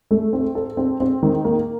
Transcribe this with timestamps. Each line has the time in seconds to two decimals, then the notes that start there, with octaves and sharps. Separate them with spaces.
0.11 A3
0.33 C4
0.55 A4
0.77 C4
1.00 C4
1.23 D#3
1.44 A#3